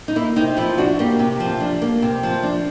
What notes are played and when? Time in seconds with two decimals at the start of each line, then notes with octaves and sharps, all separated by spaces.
0.08 D#4
0.16 A#3 E4
0.36 C3 D#4
0.57 F3 E4
0.78 D4 F#4
0.99 A#3 G4
1.19 C3
1.40 F3
1.60 D4
1.82 A#3
2.02 C3
2.23 F3
2.43 D4